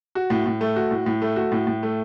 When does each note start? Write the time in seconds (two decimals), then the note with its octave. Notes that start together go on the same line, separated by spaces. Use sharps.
0.15 F#4
0.30 A2
0.46 A2
0.61 A3
0.76 F#4
0.91 A2
1.06 A2
1.22 A3
1.36 F#4
1.52 A2
1.67 A2
1.83 A3